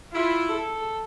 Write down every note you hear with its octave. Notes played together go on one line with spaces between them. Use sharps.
E4 F4
A4